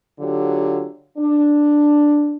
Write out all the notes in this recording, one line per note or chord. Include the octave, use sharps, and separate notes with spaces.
D3 F#3 F4 G4
D4